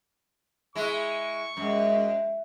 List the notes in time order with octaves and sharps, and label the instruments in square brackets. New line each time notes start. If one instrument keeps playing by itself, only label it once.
[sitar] G#3 E4 [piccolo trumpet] C#6
[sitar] F#2 [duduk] G#3